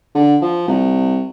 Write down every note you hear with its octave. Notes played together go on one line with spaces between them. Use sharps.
D3
F3
C2